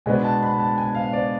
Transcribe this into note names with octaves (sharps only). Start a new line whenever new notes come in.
B2 G#3 B3 D4 G#5
A5
B5
A5
G#5
F5
D5